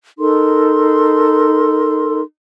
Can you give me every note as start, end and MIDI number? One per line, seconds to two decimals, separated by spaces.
0.18 2.21 63
0.18 2.21 69
0.18 2.21 70
0.18 2.21 84